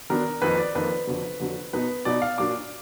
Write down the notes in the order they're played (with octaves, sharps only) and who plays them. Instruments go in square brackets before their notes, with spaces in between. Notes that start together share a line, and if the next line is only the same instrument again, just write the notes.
[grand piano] D#3 F#3 B3 D4 A#4
F2 D#3 A#3 D#4 B4
D5
F2 D#3 A#3 D#4 B4
F2 D3 F#3
F2 D3 F#3
B2 F#3 B3 D#4 B4
B2 F#3 B3 D#4 D5
F5
A#2 F#3 D4 D6